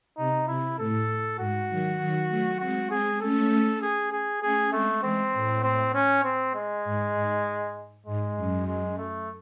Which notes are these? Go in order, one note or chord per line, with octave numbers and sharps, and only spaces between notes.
C3 D#4
C3 E4
A2 A4
G#2 F#4
D#3 F#3
D#3 F#3
F#3 A3
G#3 C4 F#4
G#3 C4 G#4
A3 C#4 A4
G#4
G#4
A3 C#4 G#4
G#3 A3 C4
E3 G#3 C4
A2
C4
C#4
C4
G#3
G#2
G#2
G#2 G#3
F#2
G#3
A3